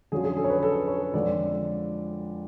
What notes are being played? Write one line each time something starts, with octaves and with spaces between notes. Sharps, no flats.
F2 D3 F#3 C#4 F4 G#4
G#4
A4
C#5
B4
A4
C#5
F2 D3 F3 G#3 D4 D5